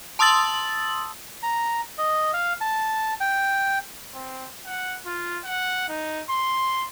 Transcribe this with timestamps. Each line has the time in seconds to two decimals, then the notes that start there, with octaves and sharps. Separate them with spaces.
0.19 A5 C6 D#6 E6 A6 F#7
1.43 A#5
1.98 D#5
2.33 F5
2.61 A5
3.20 G5
4.14 C4
4.66 F#5
5.06 F4
5.44 F#5
5.89 D#4
6.29 C6